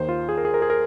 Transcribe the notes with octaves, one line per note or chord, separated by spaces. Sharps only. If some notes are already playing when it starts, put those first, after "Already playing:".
Already playing: D#2 D#3 C5
F4
G#4
A#4
G#4
A#4
G#4
A#4